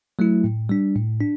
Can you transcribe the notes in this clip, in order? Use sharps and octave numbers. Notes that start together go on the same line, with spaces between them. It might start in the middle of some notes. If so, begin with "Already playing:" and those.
F#3 A3 E4
A2
G3 D4
A2
D4